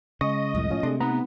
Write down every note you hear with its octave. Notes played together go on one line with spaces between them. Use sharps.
C#3 G#3 D#5 C#6
C2 F2 A2
A2 F3 C#4 F4
C3 A3 C4 D4 G#4 A4
B3 D#4 A#5